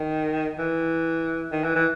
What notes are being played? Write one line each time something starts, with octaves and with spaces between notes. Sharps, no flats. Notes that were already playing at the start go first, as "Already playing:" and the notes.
Already playing: D#3
E3
D#3
E3
E3